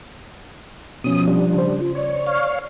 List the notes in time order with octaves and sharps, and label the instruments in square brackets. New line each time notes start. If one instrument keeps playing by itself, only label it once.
[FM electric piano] B2 C#4 [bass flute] F3 [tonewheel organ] D#6
[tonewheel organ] G3 D4
[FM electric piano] C#3 C5
[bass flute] F4
[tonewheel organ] C#5 [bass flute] D5
[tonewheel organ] C#5 F5